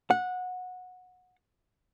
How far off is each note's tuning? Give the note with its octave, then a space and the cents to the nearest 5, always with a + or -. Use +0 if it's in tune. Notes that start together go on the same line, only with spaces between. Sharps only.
F#5 -20